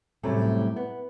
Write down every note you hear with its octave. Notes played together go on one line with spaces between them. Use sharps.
F#2 A2 C3 F#3 G3 A3
B3